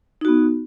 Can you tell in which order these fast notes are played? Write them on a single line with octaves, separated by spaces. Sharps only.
D#4 F#4 B3